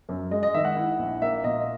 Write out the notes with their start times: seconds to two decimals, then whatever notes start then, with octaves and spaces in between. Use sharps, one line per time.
0.09 F#2
0.31 G#3 D#5
0.43 D#5
0.54 D#3 E5
0.65 F#5
0.76 E4
0.99 A#1
1.22 A#3 E5
1.44 A#2 D#5